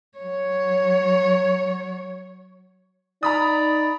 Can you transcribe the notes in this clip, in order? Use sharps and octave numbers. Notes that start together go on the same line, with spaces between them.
F#3 C#5
D#4 D5 A#5 B5 D#6